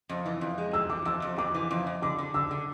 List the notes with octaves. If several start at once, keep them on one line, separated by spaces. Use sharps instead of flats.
F2
E3
F2
G#3
F2 E6
E3 D6
F2 E6
F2
F2 D6
E3
F2
F2
D3 D6
D3
D3 E6
D3